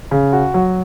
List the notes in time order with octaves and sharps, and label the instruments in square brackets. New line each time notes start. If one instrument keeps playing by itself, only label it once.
[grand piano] C#3
F#4
F#3